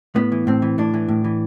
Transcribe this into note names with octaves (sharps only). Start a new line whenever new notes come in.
A2 B3
E3
A2 C4
E3
A2 D4
E3
A2
E3